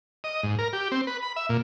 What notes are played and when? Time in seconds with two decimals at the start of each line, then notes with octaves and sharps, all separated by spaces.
0.24 D#5
0.43 G#2
0.59 A#4
0.73 G4
0.92 C4
1.07 B4
1.22 B5
1.36 E5
1.49 A#2